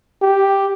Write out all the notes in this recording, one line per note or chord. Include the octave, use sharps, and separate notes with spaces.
G4